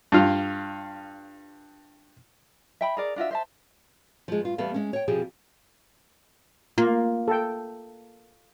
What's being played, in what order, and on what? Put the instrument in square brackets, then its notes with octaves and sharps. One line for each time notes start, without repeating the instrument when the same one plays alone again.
[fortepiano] G2 F4
[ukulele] E5 G5 B5
G#4 A#4 D5
D4 F4 F#4 E5
C5 E5 A5
[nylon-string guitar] F3 G#3
G2 F4
E2 G3 B3 A4 F5
G#3 C#4
C#5 G5
F2 B2 F3 G4 G#4 G#5
[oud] A#3 [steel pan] F4
[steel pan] A4 G5